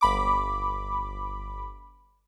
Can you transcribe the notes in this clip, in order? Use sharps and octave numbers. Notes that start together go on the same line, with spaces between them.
G1 B5 D6